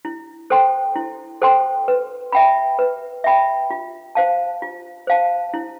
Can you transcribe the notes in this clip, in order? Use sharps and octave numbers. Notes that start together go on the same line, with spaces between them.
E4
A4 C5 G5 C6
E4
A4 C5 G5 C6
B4
E5 G5 B5
B4
E5 G5 B5
F4
C5 F5 A5
F4
C5 F5 A5
E4